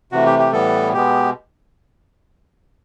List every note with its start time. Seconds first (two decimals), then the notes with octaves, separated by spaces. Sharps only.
0.12 C3 E3 A3 F#4
0.26 G4
0.39 G4
0.52 A2 E3 G3 B3 A4
0.93 B2 G#3 B3 G4